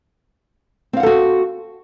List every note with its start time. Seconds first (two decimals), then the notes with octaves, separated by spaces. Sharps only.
0.93 C4
0.97 F5
1.00 F#5
1.03 A4
1.06 F#4